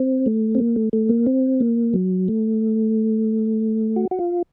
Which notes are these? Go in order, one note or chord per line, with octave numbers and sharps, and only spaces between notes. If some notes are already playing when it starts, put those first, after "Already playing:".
Already playing: C4
A3
C4
A#3
A3
A3
A#3
C4
A#3
F#3
A3
F#4
F#4
F4